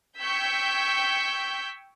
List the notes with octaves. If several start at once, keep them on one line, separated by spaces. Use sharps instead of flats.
G5 C#6 E6 G6 G#6 B6